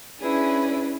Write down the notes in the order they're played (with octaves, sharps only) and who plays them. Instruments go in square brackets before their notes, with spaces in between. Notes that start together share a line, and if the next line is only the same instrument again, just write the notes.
[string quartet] C#4 D4 E4 G#4 B4